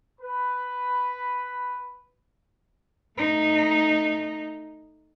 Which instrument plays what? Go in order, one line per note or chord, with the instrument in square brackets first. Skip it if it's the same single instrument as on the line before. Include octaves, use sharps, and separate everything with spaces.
[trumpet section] B4 B5
[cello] A3 D#4